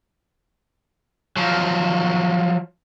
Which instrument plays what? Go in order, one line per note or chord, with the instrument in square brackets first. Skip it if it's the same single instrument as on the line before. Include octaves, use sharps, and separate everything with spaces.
[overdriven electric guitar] F3 F#3